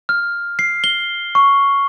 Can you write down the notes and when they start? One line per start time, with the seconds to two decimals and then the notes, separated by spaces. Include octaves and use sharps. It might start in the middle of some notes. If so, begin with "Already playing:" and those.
0.09 F6
0.59 C7
0.84 G7
1.35 C#6